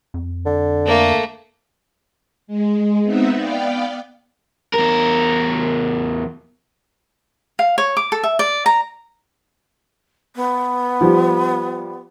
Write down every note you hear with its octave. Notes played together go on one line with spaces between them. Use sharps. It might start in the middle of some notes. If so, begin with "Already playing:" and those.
F2
D3
A3 A#3
G#3
B3 C4 D#4 E5 F#5
B3 D5 F5 G5
E2 A#4
F5
C#5
D6
A4
E5
D5
A#5
B3
F3 G3